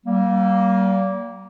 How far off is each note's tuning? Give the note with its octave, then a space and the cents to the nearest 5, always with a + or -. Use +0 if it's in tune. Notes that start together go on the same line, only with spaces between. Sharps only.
G3 -40 A#3 +0